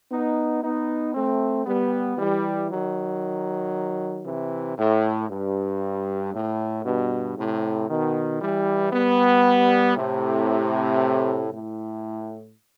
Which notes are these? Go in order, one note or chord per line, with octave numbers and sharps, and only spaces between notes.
B3 D#4
B3 D#4
A3 C4
G3 B3
E3 G3
D#3 F#3
C3 E3
A2
G2
A2
G2 B2
A2 C3
B2 D#3
E3 G3
G3 B3
A2 C3
A2